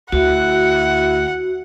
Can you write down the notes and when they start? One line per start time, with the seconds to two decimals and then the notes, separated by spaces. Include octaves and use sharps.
0.12 D2 E4 F#4 F#5